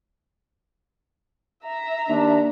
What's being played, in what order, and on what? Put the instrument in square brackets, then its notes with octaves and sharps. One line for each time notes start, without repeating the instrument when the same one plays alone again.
[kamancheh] E5 A#5
[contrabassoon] D#2 [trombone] D4